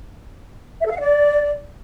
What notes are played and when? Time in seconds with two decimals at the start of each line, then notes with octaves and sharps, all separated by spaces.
0.80 E5
0.85 A4
0.90 F5
0.96 F#5
1.01 D5